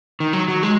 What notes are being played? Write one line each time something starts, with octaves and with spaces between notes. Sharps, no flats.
D#3
F#3
F#3
G#3